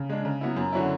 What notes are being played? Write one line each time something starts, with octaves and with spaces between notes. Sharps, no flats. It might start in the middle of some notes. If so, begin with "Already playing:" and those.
Already playing: C#3
G#3 D4
C#3
F#3 B3 E4
F#2
D3 F#3 C#4 E4